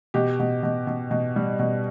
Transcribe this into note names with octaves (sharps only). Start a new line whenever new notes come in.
B2 G4
B2
B2
B2
B2
G3
B2